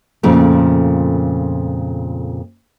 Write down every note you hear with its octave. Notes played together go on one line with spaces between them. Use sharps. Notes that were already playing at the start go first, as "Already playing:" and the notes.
F2 A#2 C#3 A3